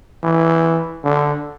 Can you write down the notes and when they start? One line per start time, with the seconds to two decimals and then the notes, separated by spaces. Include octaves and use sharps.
0.23 E3
1.04 D3